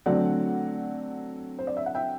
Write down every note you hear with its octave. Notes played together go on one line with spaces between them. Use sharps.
D3 F#3 A3 C4 D5 F#5
C5
D5
E5
F#5
E5 G5